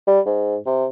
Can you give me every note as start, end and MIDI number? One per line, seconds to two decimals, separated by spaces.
0.07 0.20 55
0.26 0.57 44
0.66 0.87 48